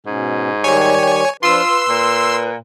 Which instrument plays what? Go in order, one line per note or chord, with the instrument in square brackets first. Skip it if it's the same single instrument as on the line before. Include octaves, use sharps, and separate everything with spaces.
[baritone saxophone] G#2 [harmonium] B2 C#4
[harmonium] D#3 G3 G4 [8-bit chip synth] C#5 G#5
[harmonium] F3 D4 B4 [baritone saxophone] F4 [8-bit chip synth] C6 E6
[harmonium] B4
[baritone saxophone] A#2